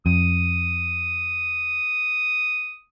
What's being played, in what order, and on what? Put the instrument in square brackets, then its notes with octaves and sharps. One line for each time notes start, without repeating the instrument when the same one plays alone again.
[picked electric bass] F2 [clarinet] D#6